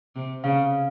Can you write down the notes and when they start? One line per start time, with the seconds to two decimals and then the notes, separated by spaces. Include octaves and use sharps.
0.16 C3
0.44 C#3 F5